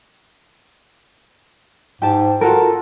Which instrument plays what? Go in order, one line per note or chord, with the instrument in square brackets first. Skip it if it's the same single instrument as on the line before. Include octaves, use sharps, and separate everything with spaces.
[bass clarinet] G#2 [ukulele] G4 A5
[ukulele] F4 F#4 A#4 [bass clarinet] A4